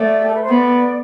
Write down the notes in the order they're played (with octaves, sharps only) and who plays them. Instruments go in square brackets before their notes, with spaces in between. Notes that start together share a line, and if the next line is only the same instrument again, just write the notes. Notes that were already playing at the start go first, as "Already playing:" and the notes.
Already playing: [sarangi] A3 [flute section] D5
[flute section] G4
A4
B4
C5
[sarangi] B3 [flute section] D5